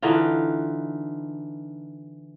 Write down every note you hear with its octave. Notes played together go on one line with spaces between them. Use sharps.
D3 E3 D#4 F4